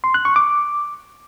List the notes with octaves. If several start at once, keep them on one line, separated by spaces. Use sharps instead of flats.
C6
F#6
C#6
D6